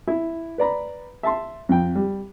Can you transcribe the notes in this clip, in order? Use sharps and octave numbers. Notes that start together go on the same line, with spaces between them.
E4 E5
B4 D5 A#5 B5
E5 A5 C6
F2 G5
G3